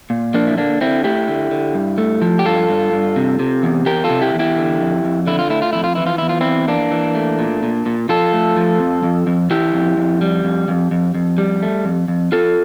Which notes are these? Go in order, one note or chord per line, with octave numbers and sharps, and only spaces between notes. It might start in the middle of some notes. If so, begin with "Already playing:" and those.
A#2
F3 A#3 D4
E4
D3 A#3 D4
D3 C4 E4
A3 E4 G4
D3
D3
G2
A3
F3
G4
G2 F4 A4
G2
G2
C3
C3
E2
E2 G4 A#4
F4 A4
C3
E4 G4
E2
E4 G4
D3
F2
F2
D3 E4
F4
A3 E4
F4
F2 E4
F4
E3 E4
F4
E2 E4
F4
E3 C4 E4
E3 A#3 D4
E3
A3
A#2
A#2
A#2
F3 F4 A4
A3
F3
F2
F2
F2
E3 E4 G4
F2
F2
G3
F2
F2
F2
F2
G3
A3
F2
F2
F2 F4 A4